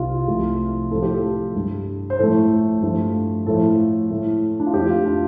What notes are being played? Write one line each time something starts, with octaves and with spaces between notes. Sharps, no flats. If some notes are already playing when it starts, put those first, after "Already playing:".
Already playing: C2 C3 G3 F4
C2 C3 F3 A3
A2 F3 A3 A4
G4
A4
G2 G3
C5
A2 F3 A3 A4
G2 F3 A3
A2 F3 A3 A4
A2 A3
D4
F4
F2 F3 A3 G4
F4
D4